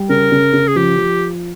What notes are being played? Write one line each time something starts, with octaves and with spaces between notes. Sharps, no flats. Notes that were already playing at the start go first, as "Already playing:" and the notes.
Already playing: G3
C#3 A#4
C#3
C#3
G#4
F3 G4
F3